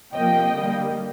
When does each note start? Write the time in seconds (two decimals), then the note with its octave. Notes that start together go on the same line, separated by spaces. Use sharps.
0.14 C3 F3 A#3 D#5 G5
0.53 D3 G3 A#3